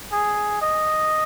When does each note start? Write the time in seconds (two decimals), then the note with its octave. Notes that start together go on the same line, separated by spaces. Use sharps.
0.12 G#4
0.62 D#5